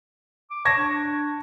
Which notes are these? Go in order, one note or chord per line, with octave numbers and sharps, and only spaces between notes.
D6
A5 C#6 G#6 A#6
D4